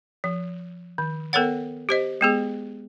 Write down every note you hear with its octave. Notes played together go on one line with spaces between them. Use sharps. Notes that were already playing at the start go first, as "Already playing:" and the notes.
F3
D#3
B3 A4 A#4 C#5 F#5
G4 C5 D#5
G#3 B3 G#4